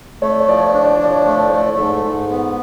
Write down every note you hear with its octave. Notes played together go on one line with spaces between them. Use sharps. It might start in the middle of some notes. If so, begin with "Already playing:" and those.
A3 C#5
D5
C#5
F3 D5
C#5
D5
D4 C#5
D5
C#5
F3 D5
C#5
A3 D5
C#5
D5
A3 C#5
D5
C#5
G#2 A4
G#2
B3